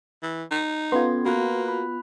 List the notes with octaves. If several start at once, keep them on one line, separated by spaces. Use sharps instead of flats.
E3
D#4
B3 C#4 F4 A4 C6 G#6
A#3 F#4 B5 C6 F#6
B5 F#6